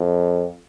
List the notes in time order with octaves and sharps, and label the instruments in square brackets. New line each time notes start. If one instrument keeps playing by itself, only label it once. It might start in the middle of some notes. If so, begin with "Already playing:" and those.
Already playing: [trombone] F2